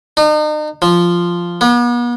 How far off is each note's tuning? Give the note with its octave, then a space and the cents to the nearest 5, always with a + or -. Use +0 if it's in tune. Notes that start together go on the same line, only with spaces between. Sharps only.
D#4 -40
F3 -5
B3 -40